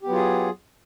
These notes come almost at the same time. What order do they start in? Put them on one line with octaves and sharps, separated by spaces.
G4 B3 F#3 F4 G#4